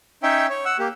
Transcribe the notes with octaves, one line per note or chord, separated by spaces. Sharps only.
C#4 D#4 C#5 E5 G5
C#5
F#5 E6
A#3 G4